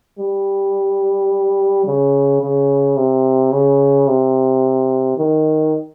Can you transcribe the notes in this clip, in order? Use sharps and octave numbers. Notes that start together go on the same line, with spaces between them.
G3
C#3
C#3
C3
C#3
C3
D#3